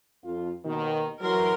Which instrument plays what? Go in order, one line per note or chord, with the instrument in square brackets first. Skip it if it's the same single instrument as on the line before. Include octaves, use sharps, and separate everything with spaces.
[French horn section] F2 F4
D#2 B2 D#3
[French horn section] E3 F#3 [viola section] A#4 C6